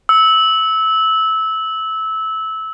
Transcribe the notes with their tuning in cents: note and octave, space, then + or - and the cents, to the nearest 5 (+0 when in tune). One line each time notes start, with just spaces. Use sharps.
E6 -20